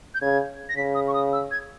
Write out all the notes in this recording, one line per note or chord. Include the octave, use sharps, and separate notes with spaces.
G6
C#3 G#6
A#6
C#3 B6
D#6
C#6
D#6
E6
G#6